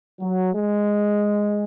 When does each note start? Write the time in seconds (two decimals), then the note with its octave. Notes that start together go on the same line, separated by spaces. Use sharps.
0.20 F#3
0.54 G#3